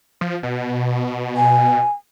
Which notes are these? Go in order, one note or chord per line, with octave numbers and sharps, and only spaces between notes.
F3
B2
G#5